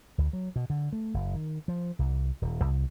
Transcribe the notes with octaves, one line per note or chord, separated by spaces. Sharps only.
D2
F#3
B2
D3
A3
F#1
D#3
F3
C2
D#1
C2